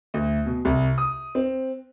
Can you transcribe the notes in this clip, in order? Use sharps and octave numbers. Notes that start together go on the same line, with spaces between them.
D2
B2
C2
D#6
C4